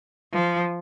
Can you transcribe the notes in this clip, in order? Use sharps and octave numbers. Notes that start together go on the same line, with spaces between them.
F3